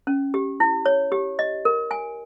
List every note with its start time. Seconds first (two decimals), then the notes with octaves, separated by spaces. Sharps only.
0.07 C#4
0.34 G4
0.60 E4
0.86 C#5
1.12 G4
1.39 D#5
1.65 A#4
1.91 G#5